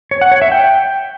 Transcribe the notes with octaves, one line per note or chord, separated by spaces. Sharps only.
C#5
F#5
C#5
E5
G5